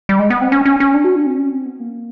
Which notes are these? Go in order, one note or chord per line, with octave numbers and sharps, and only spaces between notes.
G3
G#3
B3
C4
C#4
C#4
C#4
D4
F#4
D4
C4
C#4
C4
B3
A#3